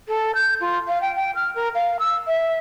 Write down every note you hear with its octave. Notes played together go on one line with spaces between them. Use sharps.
A4
G6
F4
F5
G5
G5
F6
A#4
F5
E6
E5